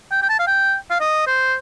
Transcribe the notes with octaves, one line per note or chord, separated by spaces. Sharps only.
G5
G5
A5
F5
G5
F5
D#5
C5